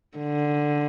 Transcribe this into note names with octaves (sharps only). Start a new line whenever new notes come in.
D3